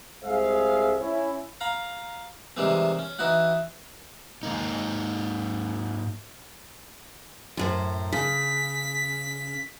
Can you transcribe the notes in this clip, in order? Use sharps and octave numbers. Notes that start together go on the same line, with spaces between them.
C2 G#3 G#4 C5 E5 F5
C#4 E4
F5 A#5 B5
C3 D#3 E3 G3 G#3 C4
C#4
E3 D#4 E4 F#4 F#5
G#2 A#3 D#4
F#2 A2 C5
C#3 B6